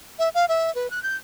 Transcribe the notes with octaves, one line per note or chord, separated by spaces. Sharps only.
E5
F5
E5
B4
F#6
G6